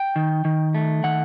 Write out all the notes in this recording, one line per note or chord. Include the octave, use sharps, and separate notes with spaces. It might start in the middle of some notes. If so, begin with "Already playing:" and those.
Already playing: G5
D#3
D#3
A3
D#3 F#5